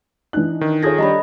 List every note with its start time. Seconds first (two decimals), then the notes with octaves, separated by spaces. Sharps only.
0.33 E3 D4 D#4 F#6
0.61 D#3
0.83 F4 G#4 A4 C#5 D#6 G#6 A#6
0.98 G3 D4 D#5 A#5 B5